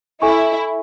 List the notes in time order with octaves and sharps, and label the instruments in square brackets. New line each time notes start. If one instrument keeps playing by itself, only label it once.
[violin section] E4 [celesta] A4 E5 G#5 C#6